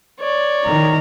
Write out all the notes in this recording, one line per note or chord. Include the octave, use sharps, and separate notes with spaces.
C#5 D5
D#3 A#5